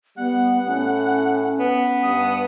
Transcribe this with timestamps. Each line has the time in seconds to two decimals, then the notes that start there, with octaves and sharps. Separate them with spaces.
0.18 G3 B3 F#5
0.67 A2 C#4
1.60 B3
2.03 G2 D#6